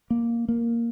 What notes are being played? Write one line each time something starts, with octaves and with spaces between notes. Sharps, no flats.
A#3
A#3